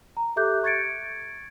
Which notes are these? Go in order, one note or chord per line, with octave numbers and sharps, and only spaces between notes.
A#5
G4 A4 E5 D6 F#6 G6
C#6 G#6 A6 C#7 D7